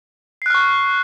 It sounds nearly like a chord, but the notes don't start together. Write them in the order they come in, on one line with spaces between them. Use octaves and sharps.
C7 F#6 F6 C#6